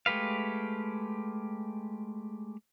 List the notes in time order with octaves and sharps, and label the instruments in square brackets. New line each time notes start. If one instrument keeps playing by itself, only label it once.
[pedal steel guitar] G#3 A3 G4 B4 F5